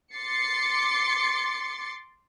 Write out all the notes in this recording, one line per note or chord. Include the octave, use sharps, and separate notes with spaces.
C6 D6 A6 C7 C#7